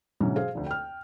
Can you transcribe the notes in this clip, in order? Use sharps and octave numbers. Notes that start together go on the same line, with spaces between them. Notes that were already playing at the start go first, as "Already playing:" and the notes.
G#2 B2 D3 E3 F#3 C#4
G#4 C5 F5
F1 D2
G5 F6